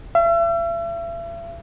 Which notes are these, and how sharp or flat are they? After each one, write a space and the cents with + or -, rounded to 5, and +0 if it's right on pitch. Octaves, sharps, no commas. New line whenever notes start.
E5 +40